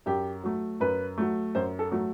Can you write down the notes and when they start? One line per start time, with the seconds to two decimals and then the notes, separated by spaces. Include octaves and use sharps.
0.06 F#2 G4
0.43 F#3 A3
0.80 F#2 B4
1.18 F#3 A3
1.55 F#2 C5
1.79 A4
1.92 F#3 A3